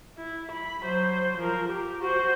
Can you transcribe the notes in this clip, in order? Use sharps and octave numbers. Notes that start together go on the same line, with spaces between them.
E4
B5
F#3 C5
F3 A#4
G4
F#4 C5